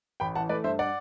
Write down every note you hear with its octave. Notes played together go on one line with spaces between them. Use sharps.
A1 G5 B5
E3 F#5 A5
A3 B4 D5
G2 C5 E5
D5 F#5